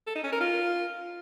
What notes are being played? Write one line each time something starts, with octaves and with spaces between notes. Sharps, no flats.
A4
D#4
C#4
A#4
F4